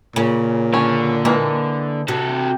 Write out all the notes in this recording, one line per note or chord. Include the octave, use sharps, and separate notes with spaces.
A#2 C#3
D3 C#4
E3 G#3 A#3
C3 F#4 A4